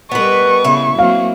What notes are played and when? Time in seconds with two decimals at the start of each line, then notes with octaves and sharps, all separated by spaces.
0.11 G3 B3 A#4 B4 D#5 C#6
0.64 C#3 B3 E4
0.99 F#3 A#3 C4 F5